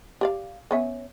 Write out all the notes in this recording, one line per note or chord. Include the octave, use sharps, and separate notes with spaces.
G4 D5 F5
B3 C#4 E5